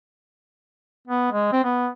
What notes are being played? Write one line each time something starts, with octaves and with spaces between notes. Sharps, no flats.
B3
G#3
C4
B3